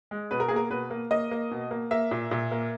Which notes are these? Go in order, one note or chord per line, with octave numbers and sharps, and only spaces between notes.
G#3
B2 B4
A#4
A#3 G#4
A#4
B2 B4
A#3
A#3 D#5
A#3
B2
A#3
A#3 E5
A#2
A#2
A#3